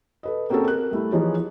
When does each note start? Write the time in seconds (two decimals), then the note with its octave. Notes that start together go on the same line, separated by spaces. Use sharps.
0.23 A4 B4 D#5
0.50 A#3 C4 C#4 F#4 G#4 A4
0.68 A#4 F#6
0.91 G3 A3 E4
1.12 E3 F3 D#4 G#4 C#5